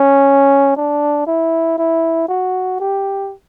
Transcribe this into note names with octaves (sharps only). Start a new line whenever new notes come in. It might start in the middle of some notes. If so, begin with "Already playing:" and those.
Already playing: C#4
D4
E4
E4
F#4
G4